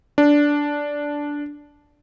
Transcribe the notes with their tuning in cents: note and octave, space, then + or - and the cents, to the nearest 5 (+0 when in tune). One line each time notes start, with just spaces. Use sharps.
D4 -10